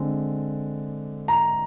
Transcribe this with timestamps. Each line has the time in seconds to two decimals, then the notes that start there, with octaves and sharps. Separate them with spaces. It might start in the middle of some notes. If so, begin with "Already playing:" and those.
Already playing: D3 G#3 C4
1.28 A#5